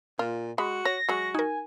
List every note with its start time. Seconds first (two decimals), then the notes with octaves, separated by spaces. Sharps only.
0.19 A#2 F4
0.58 G#3 F#4 B5
0.85 C#5 A#6
1.09 F#3 G#3 F#4
1.35 D#4 A#4 G#5